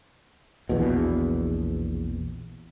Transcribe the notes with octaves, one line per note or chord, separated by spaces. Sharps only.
A#1 E2 B2